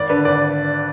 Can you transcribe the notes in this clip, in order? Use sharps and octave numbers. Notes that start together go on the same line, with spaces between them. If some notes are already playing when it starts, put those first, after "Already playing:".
Already playing: G#1 D5
D3 B4
G#1 D5